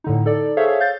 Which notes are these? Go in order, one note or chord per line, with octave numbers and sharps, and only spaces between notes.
A2 D3 D#4
D#4 A4 D5
G#4 A4 C5 C#5 E5 F5
F5 G6 A6